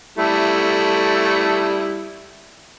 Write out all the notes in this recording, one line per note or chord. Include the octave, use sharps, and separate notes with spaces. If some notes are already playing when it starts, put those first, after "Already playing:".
G3 A3 E4